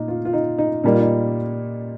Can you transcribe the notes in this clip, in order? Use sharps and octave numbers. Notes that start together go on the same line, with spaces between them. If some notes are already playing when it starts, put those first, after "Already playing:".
Already playing: A#2 D#4
F4
F4
D#4
D#4
A#2 G3 A#3 D#4
F4
D#4